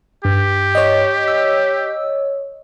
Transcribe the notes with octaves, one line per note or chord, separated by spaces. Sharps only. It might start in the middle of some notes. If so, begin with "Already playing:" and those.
G2 G4
C#5 D#5
E6